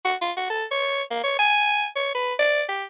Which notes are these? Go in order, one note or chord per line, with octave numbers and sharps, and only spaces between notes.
F#4
F4
F#4
A4
C#5
A#3
C#5
G#5
C#5
B4
D5
G4